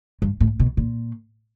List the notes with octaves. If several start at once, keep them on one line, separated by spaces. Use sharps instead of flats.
G2
A2
B2
A#2